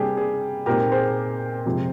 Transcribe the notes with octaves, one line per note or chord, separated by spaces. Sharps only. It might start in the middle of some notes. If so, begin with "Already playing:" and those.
Already playing: C3 G3 A#3 D4 G4 G#4
G#4
A#2 G#3 C4 D#4 G4 A#4
G#4 C5
F2 C3 F3 G#3